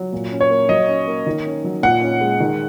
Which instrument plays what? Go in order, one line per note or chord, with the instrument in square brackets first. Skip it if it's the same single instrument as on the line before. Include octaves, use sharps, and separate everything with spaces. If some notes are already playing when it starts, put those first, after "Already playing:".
Already playing: [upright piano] F#3
A#2
C#4
[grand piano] C#5
[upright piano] A#3
[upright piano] F#3 [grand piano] D#5
[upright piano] C#4
A#3
D#3
C#4
F#3
[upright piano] A#2 [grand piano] F#5
[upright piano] C#4
G#3
D#3